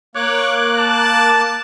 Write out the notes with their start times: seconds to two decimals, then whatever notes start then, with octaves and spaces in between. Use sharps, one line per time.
0.15 A#3 C#5 D6 F#6
0.77 A5